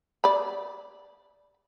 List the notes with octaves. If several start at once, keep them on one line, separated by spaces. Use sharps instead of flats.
D5 B5